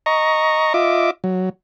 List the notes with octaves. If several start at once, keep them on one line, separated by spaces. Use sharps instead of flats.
D#5 A#5 C#6
F4 D#5 E5 D6
F#3